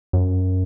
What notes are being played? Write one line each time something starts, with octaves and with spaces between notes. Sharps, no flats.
F#2